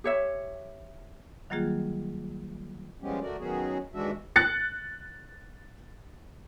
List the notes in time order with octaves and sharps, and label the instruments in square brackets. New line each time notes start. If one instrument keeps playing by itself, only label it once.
[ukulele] G4 C#5 E5
[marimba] D#3 F#3 G3 A#3 F4 G#4
[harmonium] F3 G3 G#3 B3 C#4 G4
D2 A3 F#4 A#4 D5
D#3 F#3 B3 C#4 F#4 G#4
D#2 E3 G#3 D4 F#4 E5
[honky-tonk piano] F#6 A6 C#7